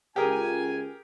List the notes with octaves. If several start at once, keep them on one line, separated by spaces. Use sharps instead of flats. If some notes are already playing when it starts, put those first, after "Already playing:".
C#2 G4 G#4 A#4 G#5